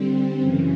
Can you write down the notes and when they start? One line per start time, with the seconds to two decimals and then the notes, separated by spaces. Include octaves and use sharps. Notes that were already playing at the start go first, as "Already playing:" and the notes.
Already playing: D3 G3 C4
0.40 F#2 C#3 E3